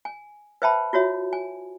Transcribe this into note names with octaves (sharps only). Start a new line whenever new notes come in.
G#5
B4 C5 E5 G5 A5 B5
F4 F#4 C#5 E5
G#5